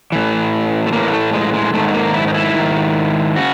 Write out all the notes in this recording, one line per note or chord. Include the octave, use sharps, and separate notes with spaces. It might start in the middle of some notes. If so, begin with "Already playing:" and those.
A2 E3
A3
A2 E3 A#3
A3
G#3
G#3
G#2 D#3 A3
A3
A#3
E4
D#4
E4
G#2 D#3
C#3 F#4